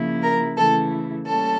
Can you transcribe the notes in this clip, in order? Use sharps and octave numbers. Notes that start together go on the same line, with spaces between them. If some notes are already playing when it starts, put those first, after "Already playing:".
Already playing: C#3 F3 A#3 E4
A#4 A#5
C#3 E3 A3 E4 A4 A5
G3 A#3 C#4 A4 A5